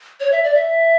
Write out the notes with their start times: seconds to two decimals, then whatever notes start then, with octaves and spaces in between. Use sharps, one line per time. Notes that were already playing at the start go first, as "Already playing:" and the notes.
0.20 C#5
0.32 E5
0.44 D5
0.54 E5